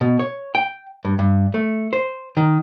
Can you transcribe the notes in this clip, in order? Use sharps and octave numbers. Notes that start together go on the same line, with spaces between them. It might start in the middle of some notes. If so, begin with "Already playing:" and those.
B2
C#5
G5
G2
G2
A3
C5
D#3